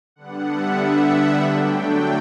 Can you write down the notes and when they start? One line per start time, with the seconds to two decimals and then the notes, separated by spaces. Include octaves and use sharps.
0.16 D3 G3 B3 D4 F#5
0.47 E5
0.78 F#5
1.40 D3 F#3 A3 D4 G5